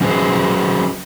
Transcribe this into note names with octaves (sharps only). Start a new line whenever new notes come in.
F#3 C#4 F#4 G#4 B4 C5